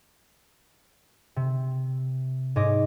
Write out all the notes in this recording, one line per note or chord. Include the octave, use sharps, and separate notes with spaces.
C3
G#2 C#5 D#5 D6